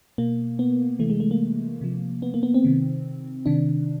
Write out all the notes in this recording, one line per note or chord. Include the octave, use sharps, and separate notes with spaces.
B2 A#3
B3
C3 E3 A3
G#3
A3
A#3
C3 F3
B3
A#3
B3
C4
C3 D#3
C3 D#3 D4